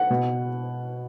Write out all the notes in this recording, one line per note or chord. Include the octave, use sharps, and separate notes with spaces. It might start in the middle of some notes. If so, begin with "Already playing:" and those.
Already playing: F#5
B2